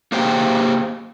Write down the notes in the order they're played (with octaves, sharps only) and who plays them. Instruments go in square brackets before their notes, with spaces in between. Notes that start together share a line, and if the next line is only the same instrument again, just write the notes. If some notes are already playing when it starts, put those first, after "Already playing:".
[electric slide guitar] A#3 G4 G#4 C5 F5 G5